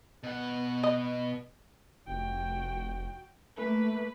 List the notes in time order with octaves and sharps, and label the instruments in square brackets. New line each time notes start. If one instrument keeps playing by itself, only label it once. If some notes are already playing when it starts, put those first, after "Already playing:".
[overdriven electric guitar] B2 F#5
[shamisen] D#5
[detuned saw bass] F1 [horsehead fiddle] F#4 G5
[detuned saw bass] A3 [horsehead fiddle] A#3 B4